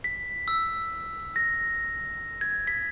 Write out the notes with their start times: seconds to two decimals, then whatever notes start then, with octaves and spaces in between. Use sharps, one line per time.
0.04 B6
0.48 E6
1.36 A#6
2.41 G#6
2.67 B6